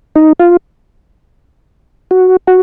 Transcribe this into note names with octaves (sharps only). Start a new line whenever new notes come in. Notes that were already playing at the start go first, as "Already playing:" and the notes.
D#4
F4
F#4
F#4